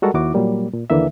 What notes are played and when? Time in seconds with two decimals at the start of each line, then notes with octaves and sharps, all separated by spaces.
0.02 G3 G#3 F#4 A4 A#4 F#5
0.14 D#2 E4 F#4 D6
0.34 A#2 F#3 G3 A#3
0.74 A#2
0.90 D#2 D3 E3 A#3 E5